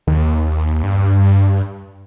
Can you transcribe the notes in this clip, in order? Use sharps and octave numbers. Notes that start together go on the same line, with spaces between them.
D#2
G2